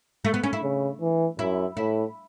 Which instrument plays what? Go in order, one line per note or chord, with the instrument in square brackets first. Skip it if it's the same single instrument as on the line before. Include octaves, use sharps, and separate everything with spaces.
[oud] A3
B3
C#4
E4
[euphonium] C#3
E3
[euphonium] F#2 [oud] E4
[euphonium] A2 [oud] E4